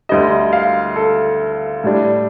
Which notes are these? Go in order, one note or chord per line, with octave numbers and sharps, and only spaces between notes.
D2 D3 G3 D#5
F5
A4
A2 G3 D4